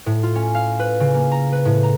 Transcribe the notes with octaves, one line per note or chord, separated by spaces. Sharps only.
A2
F4
C#4
F5
B4
C#3
A#3
A#5
B4
A2
A#5